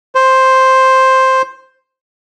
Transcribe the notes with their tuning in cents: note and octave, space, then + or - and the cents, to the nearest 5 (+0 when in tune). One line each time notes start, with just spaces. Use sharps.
C5 +5